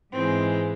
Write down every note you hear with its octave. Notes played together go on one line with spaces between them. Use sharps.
G#2 E3 G#3 C4